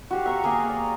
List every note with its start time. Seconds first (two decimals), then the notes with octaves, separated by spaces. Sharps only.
0.11 F#4 G4 F5
0.26 E5 A#5 C#6
0.44 A#3 G#4 A#4 F5
0.70 D5